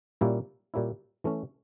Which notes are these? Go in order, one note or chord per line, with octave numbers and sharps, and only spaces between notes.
A#2 G3 A#3 C#4 E4
A#2 G3 A#3 C#4 E4
E3 A3 C#4